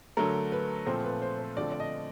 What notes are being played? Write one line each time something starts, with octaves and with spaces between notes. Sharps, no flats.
D3 F#3 A3 A#4
B4
A#2 F3 A3 C4 C5
B4
C5
C5
D3 F3 A3 C4 D5
D5
D#5